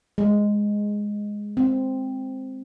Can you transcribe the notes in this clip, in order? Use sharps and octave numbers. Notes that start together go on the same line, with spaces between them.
G#3
C4